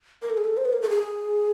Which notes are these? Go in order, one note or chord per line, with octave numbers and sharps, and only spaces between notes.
A#4
A4
G#4
A4
C5
B4
A#4
A4
G#4